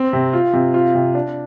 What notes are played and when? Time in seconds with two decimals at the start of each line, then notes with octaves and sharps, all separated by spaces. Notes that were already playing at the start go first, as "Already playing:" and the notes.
Already playing: C4
0.13 C3
0.33 F4
0.53 C3
0.74 F4
0.95 C3
1.15 D4